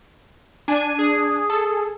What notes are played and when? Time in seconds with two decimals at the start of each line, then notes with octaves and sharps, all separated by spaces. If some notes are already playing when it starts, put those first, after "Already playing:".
0.68 D4 G#5
0.99 G#4
1.50 A4